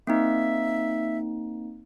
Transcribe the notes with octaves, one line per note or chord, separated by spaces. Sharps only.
A#3 C4 D#4 E5